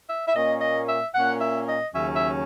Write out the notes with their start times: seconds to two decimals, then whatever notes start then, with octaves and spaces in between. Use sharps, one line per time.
0.09 E5
0.28 E5
0.34 A#2 A#3 C#4 D#5
0.61 D#5
0.88 E5
1.14 A#2 A#3 C#4 F#5
1.41 E5
1.68 D#5
1.94 D#2 C#3 F#3 C#4 E5
2.15 E5